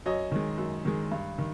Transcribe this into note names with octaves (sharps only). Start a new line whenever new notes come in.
F#2 C#5 D#5
D#3 G#3
F#2
D#3 G#3
G2
D#3